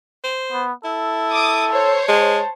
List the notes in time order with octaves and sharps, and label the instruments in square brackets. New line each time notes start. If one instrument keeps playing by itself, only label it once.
[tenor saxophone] C5
[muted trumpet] B3
[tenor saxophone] E4 [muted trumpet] A4
[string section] D6 D#6
C5 C#5
[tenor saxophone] G#3 [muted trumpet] A5